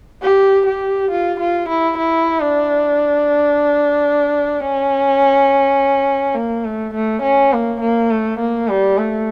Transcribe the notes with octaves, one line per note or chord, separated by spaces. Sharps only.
G4
G4
F4
F4
E4
E4
D4
C#4
A#3
A3
A3
C#4
A#3
A#3
A3
A#3
G3
A3